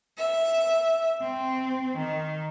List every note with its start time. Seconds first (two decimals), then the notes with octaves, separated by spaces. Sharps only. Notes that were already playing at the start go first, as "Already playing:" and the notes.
0.17 E5
1.22 C4
1.99 D#3